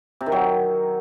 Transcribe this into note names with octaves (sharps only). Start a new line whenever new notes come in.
C3
D#3
F#3